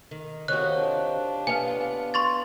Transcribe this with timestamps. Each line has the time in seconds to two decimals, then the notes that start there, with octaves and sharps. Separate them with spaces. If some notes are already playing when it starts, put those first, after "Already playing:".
0.11 D#3
0.48 D#3 C4 F#4 G4 C#5 D#5 F5 F#6
0.79 D4 F4
1.47 B3 F5 G#5
2.14 C6 C#6 A6